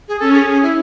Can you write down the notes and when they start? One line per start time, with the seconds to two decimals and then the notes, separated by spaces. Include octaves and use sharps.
0.08 G#4
0.19 C#4 A4
0.34 G#4
0.48 G#4
0.63 E4